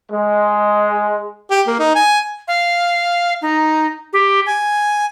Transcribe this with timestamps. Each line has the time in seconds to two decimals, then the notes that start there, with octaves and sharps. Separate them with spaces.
0.11 G#3
1.50 G4
1.67 A#3
1.79 D#4
1.95 G#5
2.48 F5
3.42 D#4
4.13 G4
4.46 G#5